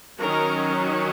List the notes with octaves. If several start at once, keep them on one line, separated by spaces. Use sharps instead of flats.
D#3 F#3 C#4 A#4